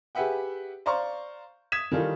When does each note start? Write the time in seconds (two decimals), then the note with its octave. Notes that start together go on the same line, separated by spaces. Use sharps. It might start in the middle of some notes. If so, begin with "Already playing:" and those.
0.15 G4 G#4 B4 E5 F#5 G5
0.86 C5 D5 F5 A#5 C6 C#6
1.72 D#6 G#6 B6 E7
1.91 D#3 E3 G3 D#4 F4 A4